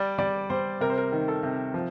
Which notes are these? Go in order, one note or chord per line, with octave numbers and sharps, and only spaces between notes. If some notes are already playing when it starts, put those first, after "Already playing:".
Already playing: G3 D5
G3 D5
G3 C5
C3 A#4
C5
A#4
D#3
A4
C3
F3